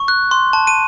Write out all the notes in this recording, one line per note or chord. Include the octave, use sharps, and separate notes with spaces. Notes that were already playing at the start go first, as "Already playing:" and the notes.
Already playing: C#6
F#6
C6
A5
D#7